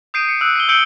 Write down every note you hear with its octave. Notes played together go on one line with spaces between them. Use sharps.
D#6 G6 C7 D7 D#7
C#7
E6 F#6 D7
C7 D#7 G7
E6 G6 C#7 D7 F#7 G7